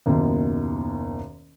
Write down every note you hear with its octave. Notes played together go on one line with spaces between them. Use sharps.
F#1 D#2 B2 D#3